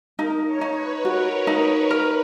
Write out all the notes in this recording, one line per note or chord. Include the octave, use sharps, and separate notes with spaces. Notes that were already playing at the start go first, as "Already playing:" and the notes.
D#4 A#4
C#5
D#4
B4
F#4 A#4
B4
D#4
C#5
A#4 B4